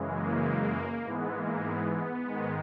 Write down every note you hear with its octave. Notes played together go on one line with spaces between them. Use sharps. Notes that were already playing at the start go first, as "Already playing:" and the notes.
Already playing: F#2 C#3 E3 G#3
A#3
G#2 E3 G#3 B3
A#3
B3
B3
G#2 D#3 G#3